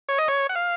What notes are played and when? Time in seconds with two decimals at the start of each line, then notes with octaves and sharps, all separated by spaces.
0.09 C#5
0.18 D#5
0.28 C#5
0.49 F#5
0.55 F5